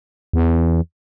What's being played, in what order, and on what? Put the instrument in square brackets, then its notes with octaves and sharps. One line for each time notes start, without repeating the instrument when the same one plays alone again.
[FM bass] E2